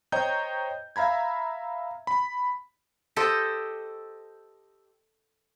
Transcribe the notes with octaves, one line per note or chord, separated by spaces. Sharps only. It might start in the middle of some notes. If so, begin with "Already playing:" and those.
C5 C#5 D#5 G5 A#5 G6
E5 F5 A#5 B5 G#6
B5
G4 A4 C5 D#5